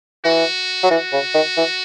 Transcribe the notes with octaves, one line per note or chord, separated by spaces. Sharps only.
E3 F#4
F#3
E3 F#4
C#3
D#3
E3